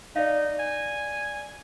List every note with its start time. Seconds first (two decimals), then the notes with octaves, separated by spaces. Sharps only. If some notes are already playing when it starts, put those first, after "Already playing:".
0.16 D#4 D5 F5
0.59 G#5